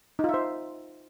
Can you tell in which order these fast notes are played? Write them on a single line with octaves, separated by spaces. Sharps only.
D#4 F4 E5 C5